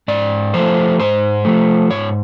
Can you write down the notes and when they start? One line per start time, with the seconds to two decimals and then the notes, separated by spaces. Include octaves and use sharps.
0.08 G#2 D5
0.54 F3 A3 C5
1.00 G#2 C5
1.45 F3 A3
1.90 G#2 C#5